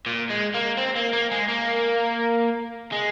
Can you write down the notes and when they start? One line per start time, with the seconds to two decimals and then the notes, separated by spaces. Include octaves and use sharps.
0.06 A#2
0.30 G#3
0.54 A#3
0.77 C4
0.96 A#3
1.13 A#3
1.31 G#3
1.49 A#3
2.92 G#3